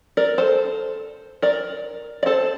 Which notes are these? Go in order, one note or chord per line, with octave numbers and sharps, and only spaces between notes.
A#4 D5
A4 C5
A#4 D5
D5
A4 C5